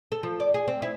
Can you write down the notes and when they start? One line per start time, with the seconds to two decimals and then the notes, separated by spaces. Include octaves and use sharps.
0.12 A4
0.23 F3
0.40 D5
0.54 G#4
0.68 C4
0.82 E4